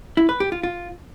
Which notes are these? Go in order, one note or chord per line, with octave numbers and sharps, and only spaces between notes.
E4
B4
G4
F4
F4